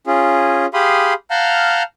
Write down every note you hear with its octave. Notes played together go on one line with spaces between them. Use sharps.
C#4 F4 G#4
G4 G#4 F5 B5 C6 D#6
F5 F#5 A5 A#5 F6 G6